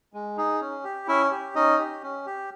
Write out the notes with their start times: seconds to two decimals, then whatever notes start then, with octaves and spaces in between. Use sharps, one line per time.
0.13 G#3
0.37 D#4 G#4
0.61 C#4
0.84 G4
1.08 C#4 E4 E5
1.31 G4
1.55 C#4 D#4 D#5
1.79 G4
2.03 C#4
2.26 G4